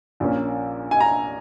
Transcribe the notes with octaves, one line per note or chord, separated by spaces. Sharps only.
A#1 A#2 A#3 C#4
G#5
A#5